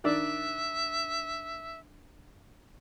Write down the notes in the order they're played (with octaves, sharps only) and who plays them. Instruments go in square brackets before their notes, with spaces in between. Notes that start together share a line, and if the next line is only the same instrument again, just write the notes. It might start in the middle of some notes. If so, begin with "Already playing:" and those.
[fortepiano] D#3 D4 D5 [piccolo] E5